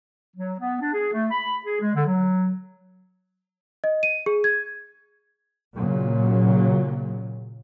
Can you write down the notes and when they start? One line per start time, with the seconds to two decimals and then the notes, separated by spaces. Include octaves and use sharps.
0.36 F#3
0.59 B3
0.81 D4
0.93 G#4
1.13 A3
1.31 B5
1.65 G#4
1.80 G#3
1.94 D3
2.06 F#3
3.84 D#5
4.03 D#7
4.26 G#4
4.44 G#6
5.75 A#2 C#3 F#3